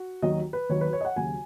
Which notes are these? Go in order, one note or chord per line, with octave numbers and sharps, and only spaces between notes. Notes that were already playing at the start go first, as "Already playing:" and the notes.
Already playing: F#4
D#2 D#3 F#3 D#5
B4
D#2 D#3 F#3 C#5
B4
C#5
D#5
F#5
D#2 C#3 F#3 G#5